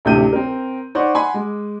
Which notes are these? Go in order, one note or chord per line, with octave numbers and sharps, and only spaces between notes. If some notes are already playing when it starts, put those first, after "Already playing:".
A1 D2 C3 G4 G6 D#7
C4 A#4
D#4 C5 D5 F#5 C#6 D6
F#5 G#5 B5 C6
G#3